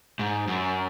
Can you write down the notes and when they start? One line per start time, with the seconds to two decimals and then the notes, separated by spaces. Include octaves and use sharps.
0.19 G#2
0.47 F#2